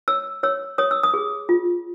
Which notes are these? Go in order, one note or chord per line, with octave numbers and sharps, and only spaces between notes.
C#5 E6
C#5 E6
C#5 D#6
E6
D#6
G#4
F4